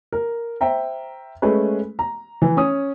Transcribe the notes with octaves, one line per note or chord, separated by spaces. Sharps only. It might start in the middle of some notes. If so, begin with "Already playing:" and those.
A#4
C5 E5 G5 A#5
G#3 A3 C#4 B4
A#5
E3
C#4 D#6